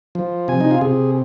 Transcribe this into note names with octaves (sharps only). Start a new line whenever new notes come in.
F3
C3 G#5
D#4
F4
C3 G#4